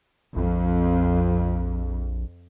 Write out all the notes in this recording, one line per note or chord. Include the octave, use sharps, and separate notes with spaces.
A#1 F2